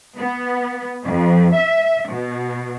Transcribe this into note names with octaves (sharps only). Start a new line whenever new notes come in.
B3
F2
E5
B2